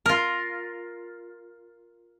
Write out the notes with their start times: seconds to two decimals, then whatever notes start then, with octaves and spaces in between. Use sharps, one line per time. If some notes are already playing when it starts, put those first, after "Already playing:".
0.06 F4 A#4